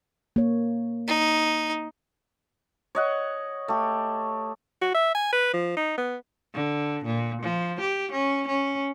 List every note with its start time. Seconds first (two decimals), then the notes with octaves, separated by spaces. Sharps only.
0.36 A#3 C#5
1.08 D#4
2.95 C#5 D#5 F#5
3.68 A3 G4
4.82 F#4
4.94 E5
5.15 G#5
5.32 B4
5.54 F3
5.77 D#4
5.98 B3
6.54 D3
7.05 A#2
7.42 F3
7.81 G4
8.12 C#4
8.48 C#4